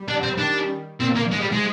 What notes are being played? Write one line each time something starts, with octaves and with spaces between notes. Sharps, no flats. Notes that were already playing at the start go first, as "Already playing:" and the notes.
Already playing: G3
D4
C4
D#3 D4
A#2 C4
A#3
G#2 G#3
G3
G#3